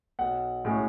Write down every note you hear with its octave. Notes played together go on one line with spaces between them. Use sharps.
B1 F#5
A2 G#3 C#4